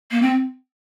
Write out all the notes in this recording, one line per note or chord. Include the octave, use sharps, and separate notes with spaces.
A#3
C4